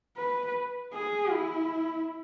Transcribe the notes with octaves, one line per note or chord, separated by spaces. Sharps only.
B4
G#4
E4